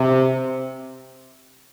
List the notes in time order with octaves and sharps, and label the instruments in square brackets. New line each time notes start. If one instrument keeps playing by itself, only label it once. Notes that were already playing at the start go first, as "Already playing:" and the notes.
Already playing: [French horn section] C3